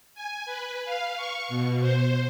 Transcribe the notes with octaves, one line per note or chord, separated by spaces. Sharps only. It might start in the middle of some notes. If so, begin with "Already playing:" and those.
G#5
B4
F5
C#6
B2
C5